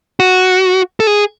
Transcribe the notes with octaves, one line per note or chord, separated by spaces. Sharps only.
F#4
A4
G#4